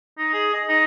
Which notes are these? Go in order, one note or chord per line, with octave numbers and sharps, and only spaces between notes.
D#4
G#4
D#5
D#4